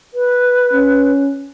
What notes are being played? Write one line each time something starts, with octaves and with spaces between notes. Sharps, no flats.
B4
C#4